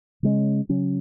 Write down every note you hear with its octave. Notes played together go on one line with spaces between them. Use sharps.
C#3 G#3 C#4
C#3 F#3 C#4